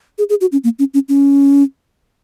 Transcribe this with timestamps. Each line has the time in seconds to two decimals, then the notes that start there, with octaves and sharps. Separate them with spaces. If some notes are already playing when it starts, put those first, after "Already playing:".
0.18 G#4
0.30 G#4
0.41 F#4
0.52 C#4
0.64 A#3
0.79 C#4
0.94 C#4
1.09 C#4